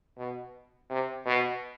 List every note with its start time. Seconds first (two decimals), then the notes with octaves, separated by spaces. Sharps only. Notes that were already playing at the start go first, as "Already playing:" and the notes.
0.18 B2
0.90 C3
1.26 B2